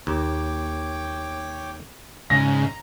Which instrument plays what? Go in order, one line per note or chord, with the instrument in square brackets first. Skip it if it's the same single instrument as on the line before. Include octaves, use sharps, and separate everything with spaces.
[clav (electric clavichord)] D#2 [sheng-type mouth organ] C#5 G5 D6
[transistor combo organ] G#2 C#3 [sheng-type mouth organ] A#5 [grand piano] A#6